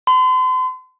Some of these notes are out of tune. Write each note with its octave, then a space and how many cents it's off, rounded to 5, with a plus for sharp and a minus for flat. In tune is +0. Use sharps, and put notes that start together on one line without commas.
C6 -40